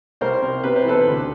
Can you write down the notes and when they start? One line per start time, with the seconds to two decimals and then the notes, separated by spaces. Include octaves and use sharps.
0.21 C2 A#4 C5
0.42 C3
0.64 C3 B4
0.76 C5
0.85 E3 A4 B4
1.07 D2